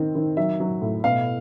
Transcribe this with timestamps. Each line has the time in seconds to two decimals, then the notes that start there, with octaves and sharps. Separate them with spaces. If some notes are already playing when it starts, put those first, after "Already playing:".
Already playing: D#3 C4
0.15 D#3
0.37 F#3 E5
0.60 F#3
0.82 A2
1.04 B2 F5